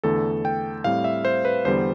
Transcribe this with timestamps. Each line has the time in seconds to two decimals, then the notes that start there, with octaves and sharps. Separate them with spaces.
0.04 E2 D3 A3 A4
0.45 G5
0.84 A2 G3 C4 F5
1.04 E5
1.25 C5
1.45 B4
1.65 E2 D3 G3 B3 C5